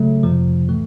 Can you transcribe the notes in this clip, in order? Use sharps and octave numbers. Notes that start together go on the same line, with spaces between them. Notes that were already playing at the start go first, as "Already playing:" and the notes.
Already playing: C#3 F#3 A3
F2 C3 F3
A2 E3 A3